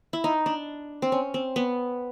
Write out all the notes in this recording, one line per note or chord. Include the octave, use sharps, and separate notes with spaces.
E4
D#4
D4
C4
C#4
C4
B3